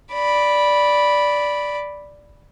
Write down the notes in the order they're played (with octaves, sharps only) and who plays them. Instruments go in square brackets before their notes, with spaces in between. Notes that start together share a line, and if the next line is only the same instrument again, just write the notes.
[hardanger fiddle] D5 B5